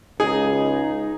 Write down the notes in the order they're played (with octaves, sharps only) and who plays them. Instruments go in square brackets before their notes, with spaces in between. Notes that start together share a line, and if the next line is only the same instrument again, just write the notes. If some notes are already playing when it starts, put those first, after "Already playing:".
[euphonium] C#2 [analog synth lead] D#4 [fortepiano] G#4